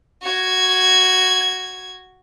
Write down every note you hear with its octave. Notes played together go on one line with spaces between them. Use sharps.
F#4 G#6